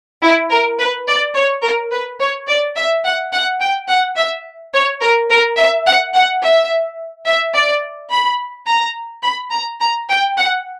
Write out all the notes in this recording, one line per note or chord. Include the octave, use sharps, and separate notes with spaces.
E4
A#4
B4
D5
C#5
A#4
B4
C#5
D5
E5
F#5
F#5
G5
F#5
E5
C#5
A#4
A#4
E5
F#5
F#5
E5
E5
D5
B5
A#5
B5
A#5
A#5
G5
F#5